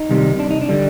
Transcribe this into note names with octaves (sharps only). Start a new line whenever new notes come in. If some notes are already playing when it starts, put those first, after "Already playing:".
Already playing: D#4
C2 C3 D#3 G3
D4
D#4
D4
D3 G3